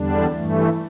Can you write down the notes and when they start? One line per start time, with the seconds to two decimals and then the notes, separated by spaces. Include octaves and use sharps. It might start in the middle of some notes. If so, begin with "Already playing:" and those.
Already playing: E2 D3 G3 D4
0.35 G2 E3 A3